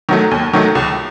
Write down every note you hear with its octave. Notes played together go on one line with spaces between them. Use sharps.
D#3 F#3 A3
D#2
D#3 F#3 A3
C#2